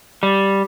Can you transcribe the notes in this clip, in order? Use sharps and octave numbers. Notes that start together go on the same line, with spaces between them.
G3